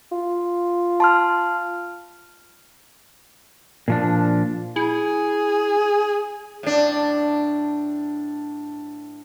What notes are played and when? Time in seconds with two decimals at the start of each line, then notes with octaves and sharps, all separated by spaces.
0.12 F4
1.00 A5 C6 F6
3.88 A#2 F3 D4
4.76 E4 G#4
6.63 A2 D4